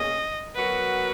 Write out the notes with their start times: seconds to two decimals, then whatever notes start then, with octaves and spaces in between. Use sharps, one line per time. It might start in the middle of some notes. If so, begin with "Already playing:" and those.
Already playing: B2 A#3 C#4 G#4 D#5
0.56 F#3 B3 F#4 A#4 B4